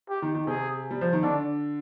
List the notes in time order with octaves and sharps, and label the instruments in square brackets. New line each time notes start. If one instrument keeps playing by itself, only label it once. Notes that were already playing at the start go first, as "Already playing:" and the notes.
[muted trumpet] G4
[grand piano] D#3
D#3
[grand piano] C3 [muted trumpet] G#4
[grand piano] G3
F3
D#3
[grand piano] D3 [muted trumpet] D4